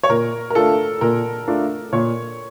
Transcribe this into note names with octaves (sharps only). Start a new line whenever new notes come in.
C#5
A#2 A#4
A#4
A3 D4 F4 A4
A#2 A#4
A3 D4 F4
A#2 C#5